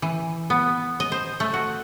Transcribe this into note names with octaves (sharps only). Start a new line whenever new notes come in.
E3
B3
D#5
C5
A3
F#4